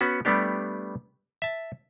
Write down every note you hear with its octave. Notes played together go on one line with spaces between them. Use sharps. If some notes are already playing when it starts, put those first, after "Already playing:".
B3 C#4 F#4
G3 A3 B3 D4 G4
E5 A5